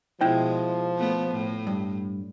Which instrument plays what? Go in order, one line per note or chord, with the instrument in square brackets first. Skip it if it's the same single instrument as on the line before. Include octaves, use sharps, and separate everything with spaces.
[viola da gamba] B2 G#3 [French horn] F3 [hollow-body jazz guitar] E4 G5
[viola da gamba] A3 B3
A2
[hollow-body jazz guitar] G2